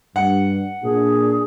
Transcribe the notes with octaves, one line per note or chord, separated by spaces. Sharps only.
G2 F#5
A#2 D4 G#4